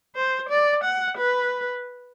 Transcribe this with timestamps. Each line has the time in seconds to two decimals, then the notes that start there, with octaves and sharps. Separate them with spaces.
0.15 C5
0.50 D5
0.84 F#5
1.18 B4